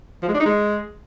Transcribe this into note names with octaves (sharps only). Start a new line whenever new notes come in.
F3
G#3
D4
D#4
G#3